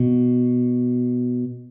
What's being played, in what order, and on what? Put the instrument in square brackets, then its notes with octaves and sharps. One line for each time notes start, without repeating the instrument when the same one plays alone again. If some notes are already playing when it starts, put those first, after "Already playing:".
Already playing: [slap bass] B2